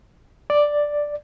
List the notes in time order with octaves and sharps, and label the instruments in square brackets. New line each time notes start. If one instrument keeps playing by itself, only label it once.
[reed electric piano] D5